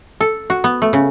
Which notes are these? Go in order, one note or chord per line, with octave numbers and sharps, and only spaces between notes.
A4
F#4
B3
A3
C#3